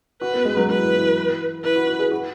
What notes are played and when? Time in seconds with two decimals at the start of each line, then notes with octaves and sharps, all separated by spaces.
0.21 F#4 B4
0.33 B3
0.45 G#3
0.57 F#3
0.68 F#3 B4
0.78 E3
0.96 E3
1.64 E4 B4
1.76 F#4
1.87 F#4
1.99 G#4
2.12 F#4